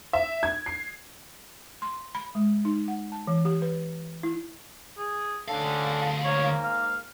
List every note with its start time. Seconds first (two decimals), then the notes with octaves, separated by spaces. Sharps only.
0.13 E5
0.43 G#6
0.66 C7
1.82 C6
2.15 B5
2.35 G#3
2.65 D#4
2.88 F#5
3.12 A5
3.27 E3
3.45 G4
3.62 B4
4.23 E4
4.98 G#4
5.48 D2 D3 C#4 A4 F5
6.24 G#2 A#3 C#5
6.63 F5